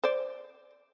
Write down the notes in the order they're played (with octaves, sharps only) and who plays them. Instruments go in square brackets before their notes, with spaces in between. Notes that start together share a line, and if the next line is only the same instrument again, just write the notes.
[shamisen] C5 D5